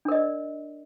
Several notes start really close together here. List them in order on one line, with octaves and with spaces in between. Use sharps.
D4 A#4 D#5 D5